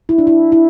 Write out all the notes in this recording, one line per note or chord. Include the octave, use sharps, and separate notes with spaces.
E4
D4
E4
E4